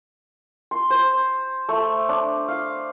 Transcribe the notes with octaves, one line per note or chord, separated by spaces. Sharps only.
C6
C5
A3
D4
F5